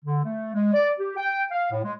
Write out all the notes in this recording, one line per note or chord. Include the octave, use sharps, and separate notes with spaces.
D3
A3
G#3
D5
G4
G5
F5
A2
G#3